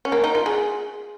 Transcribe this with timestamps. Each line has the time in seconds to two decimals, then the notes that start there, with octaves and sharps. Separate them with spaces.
0.05 C#4
0.12 A#3
0.24 D#4
0.35 F4
0.46 G#4